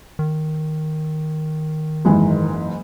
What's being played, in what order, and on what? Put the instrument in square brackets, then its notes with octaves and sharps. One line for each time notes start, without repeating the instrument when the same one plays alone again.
[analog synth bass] D#3
[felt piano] F#1 G#2 E3